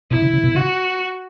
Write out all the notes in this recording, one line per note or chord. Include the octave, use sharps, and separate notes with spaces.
B2 E4
C#3
C#3
B2
C#3 F#4